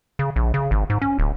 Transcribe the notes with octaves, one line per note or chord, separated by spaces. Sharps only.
C#3
A#1
C#3
G#1
G#2
C#4
D1